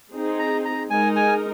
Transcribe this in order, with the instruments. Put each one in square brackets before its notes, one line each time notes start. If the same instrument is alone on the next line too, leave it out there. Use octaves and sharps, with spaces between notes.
[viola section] C4 D#4 G#4
[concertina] A#5
A#5
[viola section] G#3 D#4 A#4 [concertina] G#5
[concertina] G#5